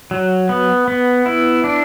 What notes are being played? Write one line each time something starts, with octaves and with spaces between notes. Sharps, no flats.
F#3
B3
B3
E4
D4